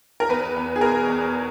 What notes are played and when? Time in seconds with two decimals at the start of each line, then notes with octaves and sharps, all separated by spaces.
0.20 A#4
0.29 E2 B4
0.56 E2
0.76 G#4
0.81 B2 A#4
1.08 E2